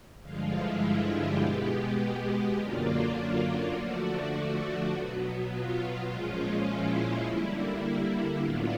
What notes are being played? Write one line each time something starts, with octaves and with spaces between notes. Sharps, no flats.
G2 D3 F3 G#3 F4
E4
F4
G4
B2 G#3 B3 G4
F#2 D3 F#3 A#3 D4 F4
D3 F3 A3 D4 F#4
B2 F#3 B3
F4
A#2 F3 G#3 C#4
E4
D3 G3 A#3
A2 F#3 B3 D4 F4